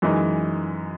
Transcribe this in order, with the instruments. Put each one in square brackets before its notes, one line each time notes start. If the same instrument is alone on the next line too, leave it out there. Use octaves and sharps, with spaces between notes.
[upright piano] F#2 E3 G#3 D#4